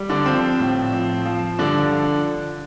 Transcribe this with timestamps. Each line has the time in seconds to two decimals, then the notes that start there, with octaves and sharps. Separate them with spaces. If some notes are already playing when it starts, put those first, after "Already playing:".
Already playing: G3
0.09 D3 D4
0.26 F3 C4
0.59 A2
0.93 F3
1.25 F3
1.58 G2 D3 D4
1.91 F3